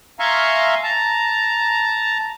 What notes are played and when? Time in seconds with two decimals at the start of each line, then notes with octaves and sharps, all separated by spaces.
0.19 E5 F5 G#5 A#5 C6 C#6
0.83 A5 A#5